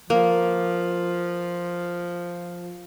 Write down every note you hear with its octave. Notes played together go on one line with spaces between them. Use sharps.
F3 A#3